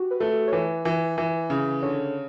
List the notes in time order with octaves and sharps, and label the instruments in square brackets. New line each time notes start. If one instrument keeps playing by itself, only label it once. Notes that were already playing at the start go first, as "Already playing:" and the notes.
Already playing: [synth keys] F#4 G4
B4
[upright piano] A3 [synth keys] A4
[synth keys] C#5
[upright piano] E3 [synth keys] B4
[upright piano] E3
E3
C#3
[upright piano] D3 [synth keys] C#5